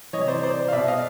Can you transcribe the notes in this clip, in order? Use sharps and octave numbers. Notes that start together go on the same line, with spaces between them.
C3 E3 C#5 D#5
C5 D5
C5 D5
F5
B2 D5 E5
D#5 F5